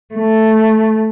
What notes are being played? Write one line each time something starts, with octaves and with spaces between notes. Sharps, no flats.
A3